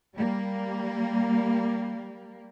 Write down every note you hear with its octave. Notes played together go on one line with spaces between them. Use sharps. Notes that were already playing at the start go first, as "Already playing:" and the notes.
G3 A#3